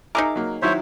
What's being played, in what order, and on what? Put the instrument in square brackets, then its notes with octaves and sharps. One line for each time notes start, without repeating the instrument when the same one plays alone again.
[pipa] D#4 G#4 A#4 [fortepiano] E5 A#5 D6
[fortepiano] F#3 A#3
[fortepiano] D#3 F#3 E4 [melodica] C5 C#5 E5